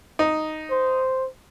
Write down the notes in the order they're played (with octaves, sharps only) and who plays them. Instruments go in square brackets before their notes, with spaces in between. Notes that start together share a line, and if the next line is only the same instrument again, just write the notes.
[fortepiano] D#4
[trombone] C5